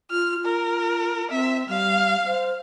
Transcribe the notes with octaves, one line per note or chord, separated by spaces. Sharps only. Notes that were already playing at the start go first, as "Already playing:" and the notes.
F4 F6
F4 A#4
C4 E5
G3 F5
C5